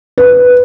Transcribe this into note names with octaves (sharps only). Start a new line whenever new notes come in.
B4